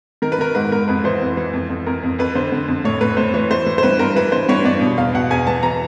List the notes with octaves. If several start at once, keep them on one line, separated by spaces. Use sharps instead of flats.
D#3 A#4
B4
D#3 A#4
G#2 B4
G#2 A#4
F2 B4
E3 C5
F2
E3
F2
F2
F2 A#4
F2
F2 B4
D3 C5
D3
F2
A2 C#5
A2 B4
A2 C5
E3 C#5
E3 C5
E3
C5
G2 B4
G2 A#4
E3 B4
G2 C5
G2 C#5
G2 D5
B2
E2 F5
B2 F#5
E2 G#5
E3 A5
E3 A#5